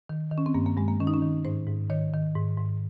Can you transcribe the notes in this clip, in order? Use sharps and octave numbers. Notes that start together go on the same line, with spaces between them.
D#3
D#3
C#4
C4
G2 A#3
A#3
G2 G#3
A#3
D#3 C#4
D#4
C#4
D#3
G#2 C5
G#2
D#3 C#5
D#3
G#2
G#2